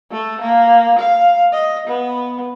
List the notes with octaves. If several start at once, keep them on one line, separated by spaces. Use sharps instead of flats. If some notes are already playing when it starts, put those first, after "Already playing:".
A3
A#3
F5
D#5
B3